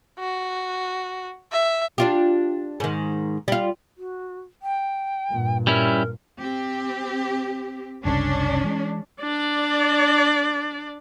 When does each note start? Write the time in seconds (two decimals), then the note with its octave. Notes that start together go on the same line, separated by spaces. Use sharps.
0.19 F#4
1.52 E5
1.98 D4 F4 G4
2.80 G#2 D#3
3.48 G3 F4
3.97 F#4
4.62 G5
5.32 G2 A#2
5.67 G3 C#4 E4 A#4
6.39 C4 G4
8.05 F#1 C2 C#3 C#4 D4
8.64 E3 G#3
9.21 D4 D5